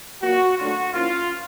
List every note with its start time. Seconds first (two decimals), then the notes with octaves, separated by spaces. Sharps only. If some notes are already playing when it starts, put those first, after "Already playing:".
0.22 A#2 F#3 A#3 F#4
0.58 D3 F#3 A3 D4 F4 F#4
0.93 F3 A#3 C#4 E4 F4